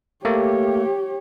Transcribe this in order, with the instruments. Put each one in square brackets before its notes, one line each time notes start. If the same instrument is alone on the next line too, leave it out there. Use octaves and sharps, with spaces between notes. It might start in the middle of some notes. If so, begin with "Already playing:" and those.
[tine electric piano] A3 A#3 [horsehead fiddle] G4 C#5